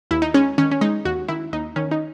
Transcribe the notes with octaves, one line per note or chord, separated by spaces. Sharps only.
D#2 E4
D#4
G#3 C#4
D#3 C#4
C#4
G#3 D#4
D#2 F#4
D#3 E4
D#2 D#4
D#3 C#4
D#4